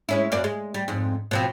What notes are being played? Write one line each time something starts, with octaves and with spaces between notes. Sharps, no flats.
G#3 C#4 E4
F#2 A#3 D5
G#3
G3
F2 G#2
B2 F3 C4